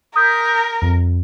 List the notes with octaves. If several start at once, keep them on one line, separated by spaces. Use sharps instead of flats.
A#4 D#6 G6 B6
F2